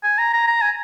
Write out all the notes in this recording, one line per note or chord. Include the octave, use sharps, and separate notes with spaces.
G#5
A#5
A#5
A#5
G#5